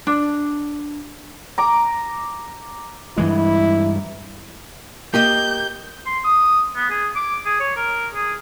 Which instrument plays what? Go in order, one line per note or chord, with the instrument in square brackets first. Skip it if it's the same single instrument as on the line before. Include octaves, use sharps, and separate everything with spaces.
[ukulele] D4
[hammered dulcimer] A#5 D6
[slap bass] G2 E3 G#3 [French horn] E4
[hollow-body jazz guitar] A#3 G4 D#5 [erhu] G6
[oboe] C6
D#6
B3
G#4
D6
G#4
C#5
A#4
G#4